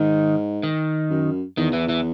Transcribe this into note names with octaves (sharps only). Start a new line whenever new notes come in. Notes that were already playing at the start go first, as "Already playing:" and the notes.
Already playing: G#2 D#3
D#3
F#2
E2 D#3
E3
E3